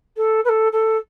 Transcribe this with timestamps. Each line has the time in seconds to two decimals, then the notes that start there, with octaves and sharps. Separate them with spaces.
0.17 A4
0.45 B4
0.49 A4
0.72 A4